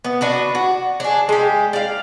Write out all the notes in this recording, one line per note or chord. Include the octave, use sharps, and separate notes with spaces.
B3
D4 F#4 B4
F#4
D4 G#4
G#3 G4
D5 F5